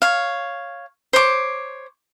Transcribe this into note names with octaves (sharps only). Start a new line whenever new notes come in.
C#5 F5
C5 C#5 D6